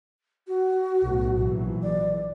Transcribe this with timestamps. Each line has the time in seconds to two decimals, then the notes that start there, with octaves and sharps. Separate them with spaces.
0.48 F#4
1.02 B1 A2
1.37 A#1 E3 F#3
1.83 D5